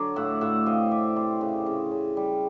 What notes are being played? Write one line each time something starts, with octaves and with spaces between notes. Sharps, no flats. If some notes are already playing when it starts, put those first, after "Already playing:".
Already playing: D3 F#3 D5
A2 E5 F#5
A2 E5 F#5
C3 D#5 F5
C3 D5 E5
C3 C5 D5
C#3
C#3
C#3
G3